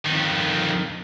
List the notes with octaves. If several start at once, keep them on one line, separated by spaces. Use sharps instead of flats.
F2 D#3